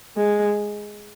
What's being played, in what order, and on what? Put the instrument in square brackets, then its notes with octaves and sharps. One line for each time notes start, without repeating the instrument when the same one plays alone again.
[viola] G#3